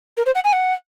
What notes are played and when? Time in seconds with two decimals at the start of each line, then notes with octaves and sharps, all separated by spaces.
0.17 A#4
0.26 C5
0.35 F#5
0.44 G#5
0.53 F#5